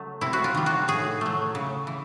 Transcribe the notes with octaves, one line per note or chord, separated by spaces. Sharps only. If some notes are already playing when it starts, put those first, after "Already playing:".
Already playing: C#3 F#3 A3
C3 E4
F#4
F4
D#3 G3
F#4
A2 G#4
F#3 A3
C#3
E3